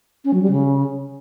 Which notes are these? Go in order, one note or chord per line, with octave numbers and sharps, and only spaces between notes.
C#4
F#3
G3
C#3